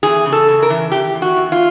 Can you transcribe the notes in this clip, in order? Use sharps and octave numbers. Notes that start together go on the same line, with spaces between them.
E2 G#4
C#3
A4
C#3
A#4
E3
E3 G4
E2
F#4
E2
F4